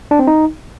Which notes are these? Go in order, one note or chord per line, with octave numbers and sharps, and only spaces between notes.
D4
C4
D#4